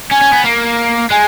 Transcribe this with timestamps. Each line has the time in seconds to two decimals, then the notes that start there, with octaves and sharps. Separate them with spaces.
0.11 C#4 G#5
0.21 C#4
0.33 B3
0.44 A#3
1.10 G#3 G#5